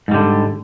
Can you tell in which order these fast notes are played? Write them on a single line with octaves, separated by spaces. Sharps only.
G#2 G3 D3